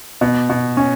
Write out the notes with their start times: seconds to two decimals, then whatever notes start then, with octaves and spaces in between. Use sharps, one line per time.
0.21 B2
0.50 B2
0.77 C#4